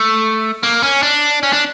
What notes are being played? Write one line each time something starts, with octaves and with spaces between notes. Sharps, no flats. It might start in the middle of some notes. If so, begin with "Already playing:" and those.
Already playing: A3
A#3
C#4
D4
C#4
D4